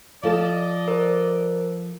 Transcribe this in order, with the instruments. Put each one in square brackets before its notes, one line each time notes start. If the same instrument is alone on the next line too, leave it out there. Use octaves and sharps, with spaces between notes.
[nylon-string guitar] F3 A4 A5 [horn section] D5 D#5
[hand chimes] A#4 C5